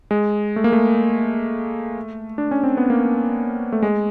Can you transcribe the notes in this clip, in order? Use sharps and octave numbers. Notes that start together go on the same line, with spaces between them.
G#3
A3
A#3
A3
D4
C#4
C4
B3
A#3
A3
G#3